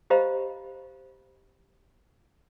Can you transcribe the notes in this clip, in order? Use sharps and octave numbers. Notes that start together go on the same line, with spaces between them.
G4 C5 D#5 F5 A#5 B5